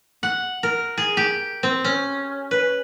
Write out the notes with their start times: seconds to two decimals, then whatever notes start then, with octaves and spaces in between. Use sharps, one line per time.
0.23 F#5
0.63 A#4
0.98 G#4
1.17 G4
1.63 C4
1.84 C#4
2.51 B4